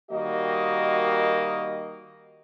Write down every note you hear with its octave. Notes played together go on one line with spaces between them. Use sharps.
D#3 G3 A#3 F#4 D#5